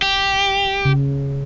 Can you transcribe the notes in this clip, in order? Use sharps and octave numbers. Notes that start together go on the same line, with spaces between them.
G4
C#3